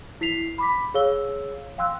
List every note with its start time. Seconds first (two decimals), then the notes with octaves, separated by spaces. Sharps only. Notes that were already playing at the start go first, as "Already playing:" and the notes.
0.21 E4 B6 C7 F7
0.58 B5 D6 B6
0.94 G#4 C#5 F5 E6 G7
1.78 F5 G5 C6 E6 F#6